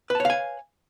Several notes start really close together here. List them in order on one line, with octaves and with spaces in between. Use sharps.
B4 A5 C#5 F5 G#5